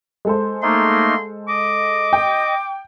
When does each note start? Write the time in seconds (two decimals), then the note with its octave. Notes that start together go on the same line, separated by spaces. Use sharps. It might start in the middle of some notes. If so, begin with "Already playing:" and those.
0.25 G#3 A4 C5
0.62 A3 A#3 D#4 C6
1.48 D#5 D6
2.13 G5